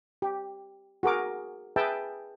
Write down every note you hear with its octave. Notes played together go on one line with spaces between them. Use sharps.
G4
F#4 G#4 A#4 D6
G#4 B4 E5 G5 A5